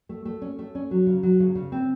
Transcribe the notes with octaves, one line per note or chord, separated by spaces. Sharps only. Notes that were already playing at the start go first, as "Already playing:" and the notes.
A3
A3
C#4
A3
C#4
F#3
C#3
F#3
C#3
C#3
C4